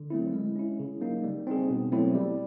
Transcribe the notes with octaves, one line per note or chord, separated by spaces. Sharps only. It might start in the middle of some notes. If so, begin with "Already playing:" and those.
Already playing: D3
F#3 A3 C4 E4
G#3
C#4 E4
C#3
F#3 A#3 D#4
G3
C4 D#4 G#4
B2
F#3 A3 C4 E4
G3